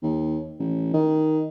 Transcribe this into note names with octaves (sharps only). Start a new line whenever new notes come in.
D#2
A1
D#3